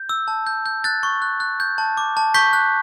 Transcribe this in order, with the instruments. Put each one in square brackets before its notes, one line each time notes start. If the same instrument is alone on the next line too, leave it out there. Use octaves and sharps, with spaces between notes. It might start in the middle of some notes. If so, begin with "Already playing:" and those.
Already playing: [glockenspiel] G6
E6
A5
G6
G6
F#6 A6
C#6
F#6
F#6
G6
A5
D6
A5
C#6 G6 B6
F#6